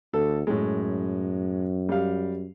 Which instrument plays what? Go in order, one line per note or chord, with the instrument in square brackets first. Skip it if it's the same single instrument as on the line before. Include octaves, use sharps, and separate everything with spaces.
[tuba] D2 [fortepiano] A4
[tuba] F#2 [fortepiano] A2 G#3
[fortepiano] G3 F5